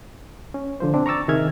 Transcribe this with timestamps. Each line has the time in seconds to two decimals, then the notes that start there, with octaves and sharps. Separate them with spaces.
0.54 C#4
0.80 D3 F3 C5
0.94 B2 C4 D4
1.06 A#5 C#6 D6 E6 A6
1.28 C3 D#3 G#4 E5 F6 G#6